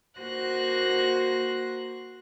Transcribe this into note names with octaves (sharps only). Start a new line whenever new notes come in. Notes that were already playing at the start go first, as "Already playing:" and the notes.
A#3 F#4 C5 F#6 A#6